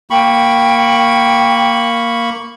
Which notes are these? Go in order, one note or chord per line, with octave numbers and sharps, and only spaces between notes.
A#3 G5 B5 C#6